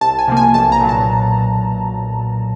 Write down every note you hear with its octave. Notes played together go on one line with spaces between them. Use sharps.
C2 A5
G#5
C3 F3 A#3
G#5
B1 A5
A#5
A#2 F#3
A5